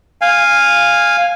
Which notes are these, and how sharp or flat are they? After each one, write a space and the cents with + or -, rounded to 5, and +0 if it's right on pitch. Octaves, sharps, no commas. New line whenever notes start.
F5 +0 G#5 -15